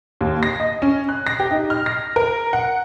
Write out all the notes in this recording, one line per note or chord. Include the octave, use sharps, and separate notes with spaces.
D#2
A#6
D#5
C#4
F#6
A#6
G4
D#4
F6
A#6
A#4
F#5